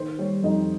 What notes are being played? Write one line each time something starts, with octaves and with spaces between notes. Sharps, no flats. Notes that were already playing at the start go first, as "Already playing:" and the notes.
Already playing: D#3 C5
G3 C#5
F2 D#4 D#5